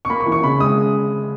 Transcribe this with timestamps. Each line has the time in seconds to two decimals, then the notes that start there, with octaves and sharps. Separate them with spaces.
0.05 C#6
0.10 A#3 B5
0.20 C#6
0.26 E3
0.32 C#6
0.43 C#3 B5
0.60 G#3 D#6